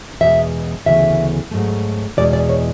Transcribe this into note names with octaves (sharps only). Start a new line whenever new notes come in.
E2 B2 G#3 E5
D2 C#3 E3 B3 E5
G#2 F#3 A3
E2 B2 G#3 D5
D5
C#5